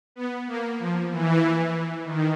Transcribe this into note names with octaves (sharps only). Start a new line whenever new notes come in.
B3
A#3
F3
E3
D#3